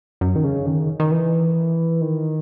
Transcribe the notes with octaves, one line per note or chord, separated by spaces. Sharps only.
F#2
D#3
C#3
D#3
D#3
E3
D#3